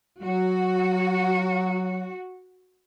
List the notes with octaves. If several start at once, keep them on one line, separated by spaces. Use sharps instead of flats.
F#3 F#4